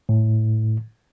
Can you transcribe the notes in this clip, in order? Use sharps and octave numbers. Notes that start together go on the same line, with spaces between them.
A2